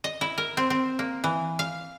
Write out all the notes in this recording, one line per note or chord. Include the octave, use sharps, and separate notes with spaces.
D#5
E4
A#4
C4
C4
A#3
E3
F5